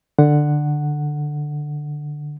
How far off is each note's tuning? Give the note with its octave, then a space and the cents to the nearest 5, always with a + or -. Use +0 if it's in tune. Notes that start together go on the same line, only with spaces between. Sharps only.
D3 +10 F#5 +0